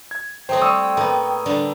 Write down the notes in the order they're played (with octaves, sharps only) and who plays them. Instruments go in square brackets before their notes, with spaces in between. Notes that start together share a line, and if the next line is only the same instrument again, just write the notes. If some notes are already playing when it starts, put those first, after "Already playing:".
[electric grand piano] G#6
[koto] F#3 A3 C4 [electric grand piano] C5 D#6 [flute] G5
[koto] G3 [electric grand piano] C#6 D#6 E6
[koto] A2 A#3 B3
D3 G3 D4